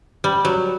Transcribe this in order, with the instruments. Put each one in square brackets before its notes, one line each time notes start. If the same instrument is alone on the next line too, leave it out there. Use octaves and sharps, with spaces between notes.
[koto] G3
F#3